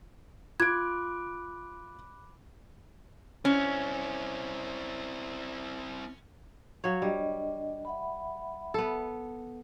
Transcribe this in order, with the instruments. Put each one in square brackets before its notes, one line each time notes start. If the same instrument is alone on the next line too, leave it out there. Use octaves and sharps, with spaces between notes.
[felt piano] F4 D7 [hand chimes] B5 D6 F#6 [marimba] G#6
[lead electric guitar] C4 E4 [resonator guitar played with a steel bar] C#4
[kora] F#3 C#5 [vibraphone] F5
[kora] G3 [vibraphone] D4 D#5
[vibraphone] E5 F#5 B5
[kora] B3 A4